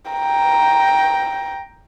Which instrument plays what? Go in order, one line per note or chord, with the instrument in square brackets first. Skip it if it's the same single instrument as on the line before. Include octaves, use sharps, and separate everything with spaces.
[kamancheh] G5 A#5